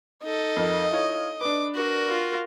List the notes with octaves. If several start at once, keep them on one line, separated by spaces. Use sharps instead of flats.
D#4 A4 D#5
F2 A#4
E4 F4 C#5
D4 B4 D6
F#4 A#4
F4